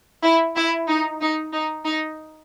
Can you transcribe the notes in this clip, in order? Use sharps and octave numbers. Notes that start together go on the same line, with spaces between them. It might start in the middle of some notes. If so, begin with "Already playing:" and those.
E4
E4
D#4
D#4
D#4
D#4